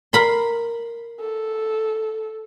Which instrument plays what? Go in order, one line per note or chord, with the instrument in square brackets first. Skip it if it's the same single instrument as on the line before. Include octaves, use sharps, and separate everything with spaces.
[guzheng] A#4 B5 C6
[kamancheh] A4